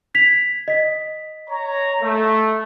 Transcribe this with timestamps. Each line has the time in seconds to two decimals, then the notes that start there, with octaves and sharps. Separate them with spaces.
0.14 G#6 B6 F7
0.68 D#5 B6
1.50 C#5 A#5
2.01 A3